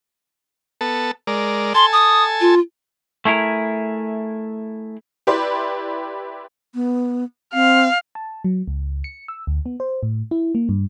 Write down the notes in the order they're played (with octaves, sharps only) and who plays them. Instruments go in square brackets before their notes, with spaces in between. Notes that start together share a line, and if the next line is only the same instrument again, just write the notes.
[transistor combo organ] B3 A4 A5
G#3 A#4 D5
[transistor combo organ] A4 G#5 A5 [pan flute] C6
[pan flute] D#6
F4
[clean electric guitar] A3 E4 G#4 A#4
[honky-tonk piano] E4 G4 B4 D5 C6
[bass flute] B3
[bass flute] C4 [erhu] F5
[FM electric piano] A5
F#3
C#2
C#7
E6
D2
B3
C5
A2
E4
A#3
G2